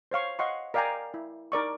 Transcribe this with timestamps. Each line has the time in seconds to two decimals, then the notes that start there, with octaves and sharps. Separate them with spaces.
0.11 C5 C#5 F5 C#6
0.39 D#5 F5 F#5 C6 C#6
0.74 A#4 D5 F5 G5 G#5 A#5
1.14 E4
1.52 D#4 A#4 D5 C#6